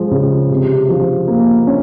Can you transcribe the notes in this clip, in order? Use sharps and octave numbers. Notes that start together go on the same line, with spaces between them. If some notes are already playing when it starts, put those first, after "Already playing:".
Already playing: F3 G#3
C#3
C3
F3
A#3
C#4